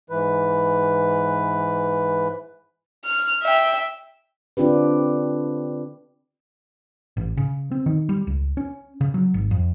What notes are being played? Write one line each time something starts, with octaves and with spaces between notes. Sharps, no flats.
G#2 E3 B4
F6
E5 G5
D3 C4 D4 F4 G4 B4
A1
C#3
C4
D#3
G3
C#2
C#4
C#3
F#3
G#1
F2